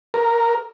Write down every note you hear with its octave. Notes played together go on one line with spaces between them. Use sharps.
A#4